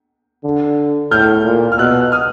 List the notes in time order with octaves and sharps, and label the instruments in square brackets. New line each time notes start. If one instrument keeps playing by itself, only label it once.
[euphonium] D3
[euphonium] A2 [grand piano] F6 G6
[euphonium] A#2
[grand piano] F6
[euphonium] B2 [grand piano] E6 F#6
[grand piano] F#6
D#6 F6